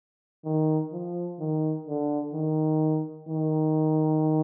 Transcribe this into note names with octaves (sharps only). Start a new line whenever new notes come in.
D#3
F3
D#3
D3
D#3
D#3